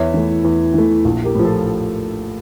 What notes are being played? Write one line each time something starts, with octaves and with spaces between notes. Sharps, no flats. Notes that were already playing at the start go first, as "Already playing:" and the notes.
Already playing: E2 C#5 E5
E3 A3
E2
E3 A3
A#1
G4 A#4
A2 F3
F4 A4